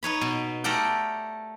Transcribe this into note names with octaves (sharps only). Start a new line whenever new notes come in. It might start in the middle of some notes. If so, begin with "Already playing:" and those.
D#4 B4 C#5 B5
B2
A3 G4 A#4 D5 F#5 G5